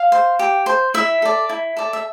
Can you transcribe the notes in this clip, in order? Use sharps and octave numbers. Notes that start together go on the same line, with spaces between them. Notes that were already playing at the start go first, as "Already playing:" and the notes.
Already playing: F5
C5
G4
C5
E4 E5
A4 D5
E4
A4 D5
E5